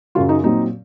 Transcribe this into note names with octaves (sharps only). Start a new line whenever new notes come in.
F#2 C#3 F#3 F4
D#4
A#2 F#3 C4 D#4